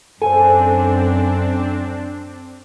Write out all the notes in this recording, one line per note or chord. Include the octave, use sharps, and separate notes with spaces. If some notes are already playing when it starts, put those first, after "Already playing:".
F#2 C4 D4 A4 C5 G#5